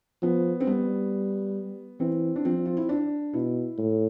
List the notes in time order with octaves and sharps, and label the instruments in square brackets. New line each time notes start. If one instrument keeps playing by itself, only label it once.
[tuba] F3 [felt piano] B3
[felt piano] C4
[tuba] G3 [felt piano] B3
[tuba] E3 [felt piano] C4
[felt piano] D4
[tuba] F3 [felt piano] C4
[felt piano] F4
E4
D4
[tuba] B2 [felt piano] E4
[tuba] A2